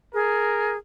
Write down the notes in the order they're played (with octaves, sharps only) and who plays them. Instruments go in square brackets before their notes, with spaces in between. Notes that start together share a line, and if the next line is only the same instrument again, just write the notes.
[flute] G#4 [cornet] A#4